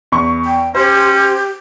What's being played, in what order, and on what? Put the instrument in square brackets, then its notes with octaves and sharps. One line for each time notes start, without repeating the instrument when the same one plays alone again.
[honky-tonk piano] E2 C#6
[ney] G5
[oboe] C#4 [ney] G4 [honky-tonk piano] C5